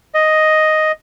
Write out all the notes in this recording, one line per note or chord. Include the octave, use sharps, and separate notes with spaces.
D#5